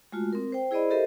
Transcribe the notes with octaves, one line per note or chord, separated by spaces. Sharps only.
G#3 A3 F4 F#4
C4 A#4
C5 G5
E4 G#4 C5 D5 D#5 B5
G4 A4 A#4 C5 D#5 E5